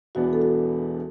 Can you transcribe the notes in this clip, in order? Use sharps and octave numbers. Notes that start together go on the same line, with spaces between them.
E1 E2 E3 B3 D4 F#4
A4
F#4